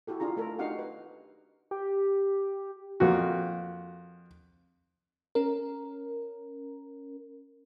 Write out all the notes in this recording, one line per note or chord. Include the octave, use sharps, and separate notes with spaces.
E4 F#4 G4 A4
D4 F4 G#4 A#5
A3 A4 A#4
D4 D#4 F#4 G4 F5 F#5
B4
G4
F2 A#3 F#4
C#4 A#4